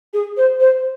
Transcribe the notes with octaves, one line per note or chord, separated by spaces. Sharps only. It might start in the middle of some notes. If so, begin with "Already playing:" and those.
G#4
C5
C5